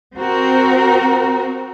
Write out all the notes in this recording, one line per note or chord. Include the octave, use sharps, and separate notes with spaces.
C4 F#4 A#4